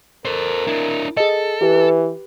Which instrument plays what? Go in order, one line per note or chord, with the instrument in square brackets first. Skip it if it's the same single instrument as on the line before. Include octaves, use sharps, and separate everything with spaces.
[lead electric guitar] A4 C5 [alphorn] A#4
[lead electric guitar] D4 E4
[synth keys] G#4 D#5 [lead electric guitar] A4
[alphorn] E3 [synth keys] G4 B4